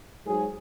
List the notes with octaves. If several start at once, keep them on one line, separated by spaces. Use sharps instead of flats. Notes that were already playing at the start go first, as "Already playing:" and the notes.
G#2 F#3 G#4